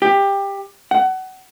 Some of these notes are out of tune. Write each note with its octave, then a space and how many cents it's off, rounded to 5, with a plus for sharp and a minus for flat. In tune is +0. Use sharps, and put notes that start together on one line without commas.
G4 +15
F#5 +25